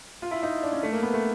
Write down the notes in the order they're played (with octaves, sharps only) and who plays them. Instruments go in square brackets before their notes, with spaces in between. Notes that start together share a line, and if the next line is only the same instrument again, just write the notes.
[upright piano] F4
E4
D#4
D4
C#4
A3
A#3
B3
A3